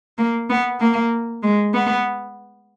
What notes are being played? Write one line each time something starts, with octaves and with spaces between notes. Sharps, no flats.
A#3
B3
A#3
G#3
B3